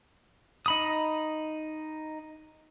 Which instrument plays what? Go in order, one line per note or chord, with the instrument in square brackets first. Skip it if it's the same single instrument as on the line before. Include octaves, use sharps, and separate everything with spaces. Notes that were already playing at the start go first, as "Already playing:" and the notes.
[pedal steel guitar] D#4 B5 D#6